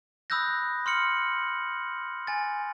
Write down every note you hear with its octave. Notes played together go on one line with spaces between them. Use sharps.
B5 D#6 E6 F#6 G6 A#6
C6 F6 C#7 F#7
G#5 A6